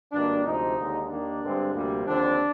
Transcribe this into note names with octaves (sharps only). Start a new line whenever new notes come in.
G#1 G2 D#3 A#3 D4
D2 C3 F3 G#3 D#4
D#2 D3 G#3
D#2 D#3 A#3 D4
G2 D3 G#3 C4
D2 C3 G3 A#3
D#2 D3 F3 C4 D4